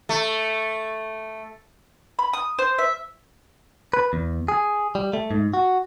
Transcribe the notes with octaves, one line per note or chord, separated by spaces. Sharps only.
A3
B5
D#6
C5
E5
B4
E2
G#4
G3
A3
G#2
F#4